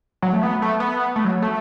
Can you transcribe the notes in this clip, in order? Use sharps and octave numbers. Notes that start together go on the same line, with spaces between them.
F#3
A3
B3
A3
B3
A3
F#3
A3